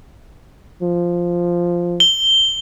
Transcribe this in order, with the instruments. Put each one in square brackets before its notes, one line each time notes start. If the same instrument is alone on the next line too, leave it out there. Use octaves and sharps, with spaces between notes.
[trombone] F3
[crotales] G7